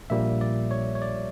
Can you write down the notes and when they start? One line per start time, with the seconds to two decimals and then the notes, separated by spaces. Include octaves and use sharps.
0.10 A#1 A#2 G3 A#3 E5
0.41 D5
0.71 C#5
0.95 C#5
1.02 D5